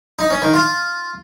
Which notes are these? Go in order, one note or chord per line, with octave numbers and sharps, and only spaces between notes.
D#4
C#4
D#3
F4